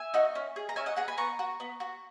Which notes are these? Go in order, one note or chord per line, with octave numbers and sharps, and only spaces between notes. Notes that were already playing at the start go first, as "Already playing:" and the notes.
Already playing: E5 G#5
D#4 F#4
C#4
G#4
A#5
C#4 E5 G#5
D#5 F#5
G#4 F#5 A#5
G#5 B5
B3 A#5 C#6
F#4
B3
F#4